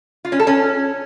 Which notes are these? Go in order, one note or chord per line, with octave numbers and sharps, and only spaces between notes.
F4
C#4
A4
C#4